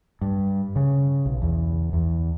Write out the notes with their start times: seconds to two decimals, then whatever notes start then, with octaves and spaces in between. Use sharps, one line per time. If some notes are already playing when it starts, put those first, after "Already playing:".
0.21 G2
0.76 C#3
1.26 B1
1.42 E2
1.93 E2